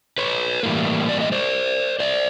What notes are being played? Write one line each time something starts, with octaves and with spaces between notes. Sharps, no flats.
B4 C#5
A2 E3 G3 A#3
D5
D#5
C5 D5
C5 D5